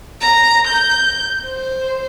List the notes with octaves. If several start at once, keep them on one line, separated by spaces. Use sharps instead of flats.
A#5
G6
C5